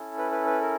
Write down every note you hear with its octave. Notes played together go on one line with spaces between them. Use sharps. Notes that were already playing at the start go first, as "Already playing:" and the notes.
Already playing: C#4 E4 A4
B4
B4
B4
A#4